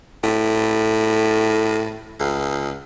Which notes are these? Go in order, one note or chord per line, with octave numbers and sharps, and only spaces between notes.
A2
C#2